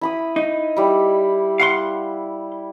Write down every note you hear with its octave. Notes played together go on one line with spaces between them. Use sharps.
E4 B5 D#6
D#4
G3 E4
F5 F#5 C6